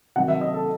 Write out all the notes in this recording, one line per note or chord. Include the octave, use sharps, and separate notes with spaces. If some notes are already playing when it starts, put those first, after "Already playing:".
C3 D#3 F#3 F#5
E5
D#5
A4